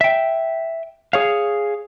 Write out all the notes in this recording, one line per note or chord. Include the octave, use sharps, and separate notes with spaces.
E5 G5
G#4 C#5 F5